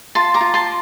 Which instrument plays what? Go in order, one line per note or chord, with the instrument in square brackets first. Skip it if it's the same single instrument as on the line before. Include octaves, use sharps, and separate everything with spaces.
[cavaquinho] F4 A5 C6
A#5 D6
F4
A5 C6